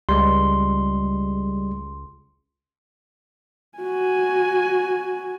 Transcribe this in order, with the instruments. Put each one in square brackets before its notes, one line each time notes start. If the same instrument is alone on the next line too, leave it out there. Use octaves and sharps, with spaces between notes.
[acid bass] C#2 [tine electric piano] G3 G#3 [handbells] C6
[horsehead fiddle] F#4 G#5